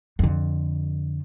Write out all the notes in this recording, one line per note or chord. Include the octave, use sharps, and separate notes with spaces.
F2 D3